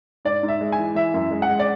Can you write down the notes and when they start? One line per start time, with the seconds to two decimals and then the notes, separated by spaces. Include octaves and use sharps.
0.25 G#2 D5
0.43 G#2
0.48 E5
0.61 G#3
0.72 G#5
0.79 E3
0.95 E3 E5
1.14 F#2
1.31 G#3
1.42 F#5
1.49 G#3
1.59 D5